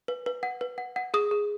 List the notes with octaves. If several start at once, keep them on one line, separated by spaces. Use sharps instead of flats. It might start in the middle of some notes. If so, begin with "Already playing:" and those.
B4
B4
F#5
B4
F#5
F#5
G#4 D#6
G#4